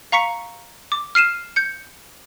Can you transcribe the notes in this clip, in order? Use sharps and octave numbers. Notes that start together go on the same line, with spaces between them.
F5 A#5 C#6 B6 C#7
D6
F6 C7 D#7 E7
G6 C#7